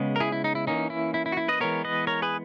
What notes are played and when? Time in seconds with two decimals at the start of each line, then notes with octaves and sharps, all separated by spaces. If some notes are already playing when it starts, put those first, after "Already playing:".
Already playing: C#3 G#3 B3
0.16 A#4
0.20 E4 G#4
0.32 E4
0.44 D#4
0.55 E4
0.67 E3 A#3 C#4 D#4
0.90 E4
1.14 E4
1.26 E4
1.32 F#4
1.37 E4
1.48 B4 D#5
1.60 E3 G#3 B3 A#4 C#5
1.85 B4 D#5
2.07 A#4 C#5
2.22 G#4 B4